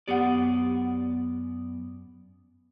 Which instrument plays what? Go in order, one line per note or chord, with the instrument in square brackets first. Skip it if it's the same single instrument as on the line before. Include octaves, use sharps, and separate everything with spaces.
[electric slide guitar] F#2 B3 D5 [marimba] G4 F#5